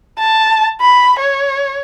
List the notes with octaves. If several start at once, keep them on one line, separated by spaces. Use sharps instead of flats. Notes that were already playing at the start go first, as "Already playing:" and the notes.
A5
B5
C#5